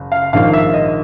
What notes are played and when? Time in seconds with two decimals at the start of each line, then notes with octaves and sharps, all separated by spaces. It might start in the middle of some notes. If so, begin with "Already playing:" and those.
Already playing: F#1
0.12 F5
0.33 A#1 G#2 D#3 F5
0.53 E5
0.74 D#5